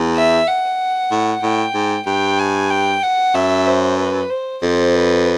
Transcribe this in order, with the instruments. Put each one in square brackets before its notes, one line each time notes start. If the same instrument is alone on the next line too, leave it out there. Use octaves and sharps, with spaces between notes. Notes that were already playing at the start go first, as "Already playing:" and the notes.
Already playing: [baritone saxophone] E2
[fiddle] E5
F#5
[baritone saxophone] A2
[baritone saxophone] A2 [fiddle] G5
[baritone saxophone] G#2
[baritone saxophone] G2 [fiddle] G5
[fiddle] G#5
G5
F#5
[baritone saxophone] F#2 [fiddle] E5
[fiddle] C5
B4
C5
[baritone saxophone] F2 [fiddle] C5
[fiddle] B4